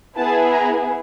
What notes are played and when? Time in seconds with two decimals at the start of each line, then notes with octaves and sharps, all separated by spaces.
0.17 B3 E4 G#4 A5
0.52 A#5